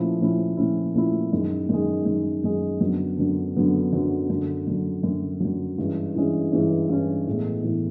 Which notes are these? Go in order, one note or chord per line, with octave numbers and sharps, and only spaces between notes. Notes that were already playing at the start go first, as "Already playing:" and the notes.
Already playing: A#2 F3 A3 C#4 E4
A#2 F3 A3 C#4 E4
A#2 F3 A3 C#4 E4
A#2 F3 A3 C#4 E4
F#2 D#3 G#3
F#2 D#3 G#3
F#2 D#3 G#3
F#2 D#3 G#3
F#2 D3 F#3 B3 D4
F#2 D3 F#3 B3 D4
F#2 D3 F#3 B3 D4
F#2 D3 F#3 B3 D4
F#2 D3 F#3
F#2 D3 F#3
F#2 D3 F#3
F#2 D3 F#3
G2 E3 G#3 C#4
G2 E3 G#3 C#4
G2 E3 G#3 C#4
G2 E3 G#3 C#4
A2 E3 G#3 B3
A2 E3 G#3 B3